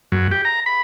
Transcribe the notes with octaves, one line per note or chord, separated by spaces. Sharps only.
F#2
G4
A#5
B5